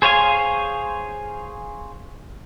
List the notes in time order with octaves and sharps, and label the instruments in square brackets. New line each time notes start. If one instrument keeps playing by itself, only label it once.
[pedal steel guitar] G#4 C5 C#5 F5 G#5